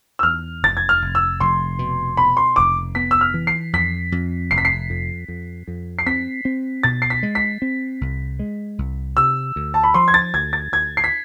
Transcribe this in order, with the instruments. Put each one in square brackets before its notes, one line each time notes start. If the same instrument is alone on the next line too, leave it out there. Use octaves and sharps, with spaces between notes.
[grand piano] E6
[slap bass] E2 [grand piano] F6
[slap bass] F1 [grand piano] A6
[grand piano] G#6
F6
[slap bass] F1
[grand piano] E6
[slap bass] F1 [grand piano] C6
[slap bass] B2
[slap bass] B2 [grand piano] B5
[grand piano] C6
[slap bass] F1 [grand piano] D6
[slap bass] B3 [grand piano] B6
[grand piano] E6
F6
[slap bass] E3
[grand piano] C7
[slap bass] F2 [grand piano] B6
[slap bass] F2
[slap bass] F1 [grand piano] C7
[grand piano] B6
C7
[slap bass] F2
F2
F2
[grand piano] C7
[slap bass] C4 [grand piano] B6
[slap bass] C4
[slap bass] B2 [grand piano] A6
[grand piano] C7
B6
[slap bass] G#3
[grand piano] B6
[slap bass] C4
C2
G#3
C2
[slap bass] C3 [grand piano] E6
[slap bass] D2
[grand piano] A5
B5
[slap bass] F3 [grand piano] C6
[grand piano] G#6
A6
[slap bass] D2 [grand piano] G#6
[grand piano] A6
[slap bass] D2 [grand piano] G#6
[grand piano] C7
B6